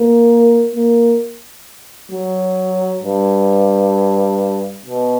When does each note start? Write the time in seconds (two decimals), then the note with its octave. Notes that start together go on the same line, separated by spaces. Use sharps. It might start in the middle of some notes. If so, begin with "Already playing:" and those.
Already playing: A#3
0.75 A#3
2.12 F#3
3.03 G2
4.86 B2